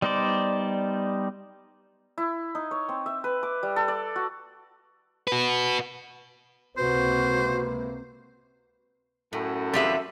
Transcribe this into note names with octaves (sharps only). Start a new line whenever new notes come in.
G3 B3 D#4 C5 D5
E4
D#4
C#5
C4
E5
B4
D6
G3
A4
D5
F#4
F#4 B4
C#2 C3 A#3 F#4 B4 C5
F#2 A2 A4
E2 G3 C4 F4 G4 G#4 B4 E5